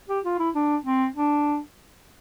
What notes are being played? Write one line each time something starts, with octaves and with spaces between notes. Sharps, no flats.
G4
F4
E4
D4
C4
D4